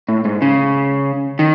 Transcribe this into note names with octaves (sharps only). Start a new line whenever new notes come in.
A2
G#2
C#3
D#3